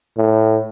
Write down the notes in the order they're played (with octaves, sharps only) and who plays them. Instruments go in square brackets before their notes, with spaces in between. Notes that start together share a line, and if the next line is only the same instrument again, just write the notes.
[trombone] A2